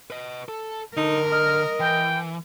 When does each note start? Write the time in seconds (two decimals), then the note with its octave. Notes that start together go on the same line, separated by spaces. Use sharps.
0.10 B4 D#5
0.48 A4
0.97 D3 D#4 A#4
1.32 D#5 F6
1.80 E3 G5